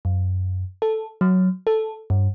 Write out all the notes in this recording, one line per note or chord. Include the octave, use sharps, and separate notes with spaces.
F#2
A4
F#3
A4
G2